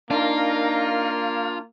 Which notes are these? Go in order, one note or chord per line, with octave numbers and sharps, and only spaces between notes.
A#3 D4 D#4 F4 A#4